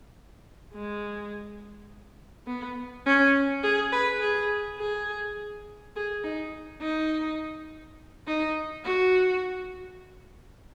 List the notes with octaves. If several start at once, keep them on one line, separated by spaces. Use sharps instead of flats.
G#3
B3
C#4
G#4
B4
G#4
G#4
G#4
D#4
D#4
D#4
F#4